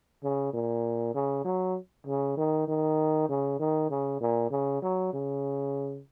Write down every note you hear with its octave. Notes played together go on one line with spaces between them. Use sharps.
C#3
A#2
C#3
F#3
C#3
D#3
D#3
C#3
D#3
C#3
A#2
C#3
F#3
C#3